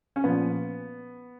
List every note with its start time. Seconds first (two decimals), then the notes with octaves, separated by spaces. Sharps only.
0.16 C#4
0.24 A#1 A#2 F3 B3